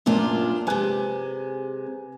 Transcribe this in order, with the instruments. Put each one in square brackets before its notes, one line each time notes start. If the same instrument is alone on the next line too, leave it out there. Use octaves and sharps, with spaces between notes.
[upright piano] F#2 A#2 [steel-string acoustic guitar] B3 D4 F4
[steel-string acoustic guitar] C3 G#3 [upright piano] B4 G#5 F#6